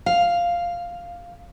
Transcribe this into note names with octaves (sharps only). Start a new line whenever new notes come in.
F5